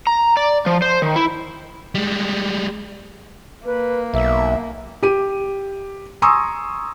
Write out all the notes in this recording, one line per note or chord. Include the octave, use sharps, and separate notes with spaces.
A#5
D5
F3
C5
D#3
E4
G3 G#3
A#3 B4
B1 E5
G4 D#7
G#5 A#5 C6 C#6 D#6 E6